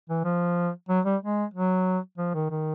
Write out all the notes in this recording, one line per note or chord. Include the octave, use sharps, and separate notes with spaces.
E3
F3
F#3
G3
G#3
F#3
F3
D#3
D#3